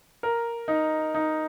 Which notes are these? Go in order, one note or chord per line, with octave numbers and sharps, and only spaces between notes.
A#4
D#4
D#4